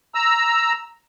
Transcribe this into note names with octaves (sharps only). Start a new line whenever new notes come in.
A#5 E6